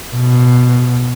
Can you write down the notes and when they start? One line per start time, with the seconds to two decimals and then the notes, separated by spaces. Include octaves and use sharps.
0.15 B2